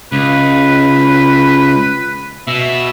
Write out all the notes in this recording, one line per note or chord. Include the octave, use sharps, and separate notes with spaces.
C#2 B4
B2 E5